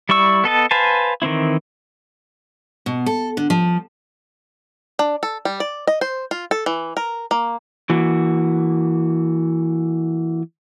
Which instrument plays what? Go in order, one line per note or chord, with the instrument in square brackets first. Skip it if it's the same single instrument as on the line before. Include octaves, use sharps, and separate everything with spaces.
[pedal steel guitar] G3 E4 D5 C#6 E6
B3 A4 D#5 A5
B4 C5 F5 G#5 A5
D#3 E3 C4 E4
[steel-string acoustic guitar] B2
A4
D3
F3
[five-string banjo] D4
A4
G3
D5
D#5
C5
F4
A4
E3
A#4
A#3
[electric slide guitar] E3 A#3 F#4